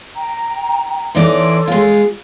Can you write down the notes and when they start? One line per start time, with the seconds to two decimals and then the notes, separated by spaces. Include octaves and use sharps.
0.15 G5 A#5
1.15 E3 D#4 A4 C#5 D5 C6
1.68 G#3 F4